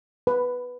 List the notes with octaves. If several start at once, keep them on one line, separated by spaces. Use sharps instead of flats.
B4